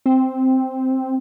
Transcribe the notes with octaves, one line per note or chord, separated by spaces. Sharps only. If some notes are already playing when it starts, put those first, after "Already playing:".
C4